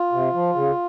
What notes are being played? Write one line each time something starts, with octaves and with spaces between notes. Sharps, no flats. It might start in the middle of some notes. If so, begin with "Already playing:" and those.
Already playing: F4
C3
F3
C#3